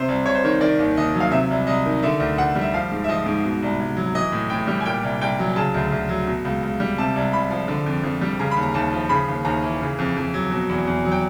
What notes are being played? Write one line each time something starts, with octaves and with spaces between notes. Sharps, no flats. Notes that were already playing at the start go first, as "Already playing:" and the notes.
Already playing: C3 C5
C2
C2 C#5
C5
D#3 C#5
D#3 D5
D#2
D#2 D#5
F#3
F5
C3 E5
C2
C2 D#5
D#3
D3 E5
D2
D2 F#5
G3
E5
F3 F5
G#2
E5
F3 D#5
G#2
B2
C2
C2
F#3
E3 D#5
A2
A2 G5
G3
G#5
A#2 G5
C2
C2 G5
F#3
C#3 A5
D2
D2
F#3
B2
C#2
C#2
G3
C3 A5
C2
C2 B5
F3
D3
F2
F2
G3
C#3 A#5
D#2 B5
A#5
D#2 A5
F3
C#3 B5
D#2
D#2 A#5
E3
C#3
F2
F2
F#3
B2
E2
E2
F#3
G5